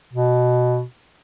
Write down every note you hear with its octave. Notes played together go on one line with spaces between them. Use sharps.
B2